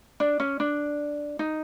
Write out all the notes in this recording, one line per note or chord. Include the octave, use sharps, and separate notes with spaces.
D4
C#4
D4
D#4